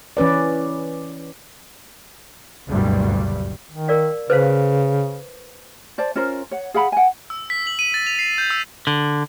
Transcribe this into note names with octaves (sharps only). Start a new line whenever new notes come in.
E3 C#4 B4 D5
F#1 D2 G2 B2 F#3 G3
D#3
A#4 D5 F5
C#3 B4 C5 F5
C5 D5 A5
C#4 F4 A#4 C5
C#5 F#5
G#4 F5 F#5 B5
F#5 G#5
E6
B6
F#7
D#7
A6
F7
C7
G6
E6
D3